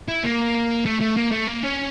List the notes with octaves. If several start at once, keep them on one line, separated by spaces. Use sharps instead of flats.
E4
A#3
A3
A3
A#3
A3
A#3
C#4